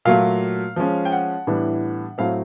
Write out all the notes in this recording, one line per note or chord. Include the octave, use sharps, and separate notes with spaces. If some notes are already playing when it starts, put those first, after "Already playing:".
A#2 F#3 A3 F5
F3 G#3 C#4
G5
F#5
A2 E3 G3 B3 D4
A2 F#3 A3 C4 F5